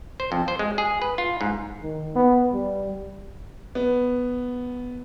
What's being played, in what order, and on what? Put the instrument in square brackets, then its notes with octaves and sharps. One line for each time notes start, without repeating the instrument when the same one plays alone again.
[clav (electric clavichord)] C5
F2
C5
G#3
G#4
B4
F4
G#2
[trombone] D#3
B3
G3
[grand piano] B3